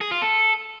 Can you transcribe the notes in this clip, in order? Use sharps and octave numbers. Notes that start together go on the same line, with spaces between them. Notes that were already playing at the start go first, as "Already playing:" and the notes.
G#4
F4
A4